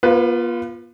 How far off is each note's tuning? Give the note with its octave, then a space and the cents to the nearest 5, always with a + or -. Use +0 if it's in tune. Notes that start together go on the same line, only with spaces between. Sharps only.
B3 -45 F4 +0 B4 +25